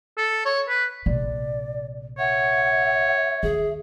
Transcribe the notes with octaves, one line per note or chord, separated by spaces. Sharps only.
A4
C#5
B4
A#1 C3 D5
C#5 E5 F#5
D#2 G#4